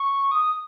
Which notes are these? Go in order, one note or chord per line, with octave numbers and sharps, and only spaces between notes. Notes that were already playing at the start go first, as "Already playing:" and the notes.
Already playing: C#6
D#6